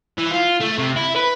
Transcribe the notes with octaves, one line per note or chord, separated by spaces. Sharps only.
E3
F4
A3
C3
E4
B4